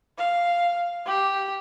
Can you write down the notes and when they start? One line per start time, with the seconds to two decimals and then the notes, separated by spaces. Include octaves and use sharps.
0.18 F5
1.06 G4